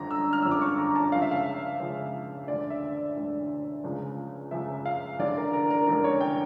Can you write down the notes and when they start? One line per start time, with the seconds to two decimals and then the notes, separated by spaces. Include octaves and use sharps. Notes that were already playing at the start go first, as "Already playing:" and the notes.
Already playing: G1 F2 D3 F3 A#5
0.11 E6
0.33 F6
0.42 G1 F2 D3 F3 E6
0.51 D6
0.61 C#6
0.78 A#5
0.96 A5
1.12 C#2 C#3 F3 F5
1.22 E5
1.31 F5
1.80 C#2 C#3 F3
2.48 E1 D2 D3 D5
2.70 E5
2.93 E5
3.16 E1 D2 D3
3.84 C#2 C#3 F3
4.51 C#2 C#3 F3 E5
4.86 F5
5.19 F1 E2 D3 D5
5.36 A#4
5.53 A#4
5.70 A#4
5.87 F1 E2 D3 A#4
6.04 C#5
6.21 G5